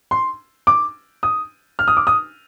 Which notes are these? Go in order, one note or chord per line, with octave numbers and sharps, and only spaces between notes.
C6
D6
D#6
F6
D#6
D6
D#6